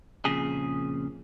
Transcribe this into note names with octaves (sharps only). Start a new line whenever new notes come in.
F2 A#2 C#3 G#4